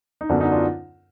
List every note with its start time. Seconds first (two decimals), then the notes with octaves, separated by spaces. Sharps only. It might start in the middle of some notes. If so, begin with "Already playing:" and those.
0.21 D#4
0.29 F#2 D3 F#3 B3 D4
0.41 D#4
0.52 D4 F4